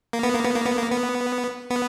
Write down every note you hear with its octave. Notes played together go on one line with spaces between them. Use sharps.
A#3
B3
A#3
B3
A#3
B3
A#3
B3
B3